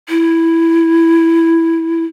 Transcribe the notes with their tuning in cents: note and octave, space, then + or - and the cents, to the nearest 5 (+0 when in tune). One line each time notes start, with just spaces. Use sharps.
E4 +0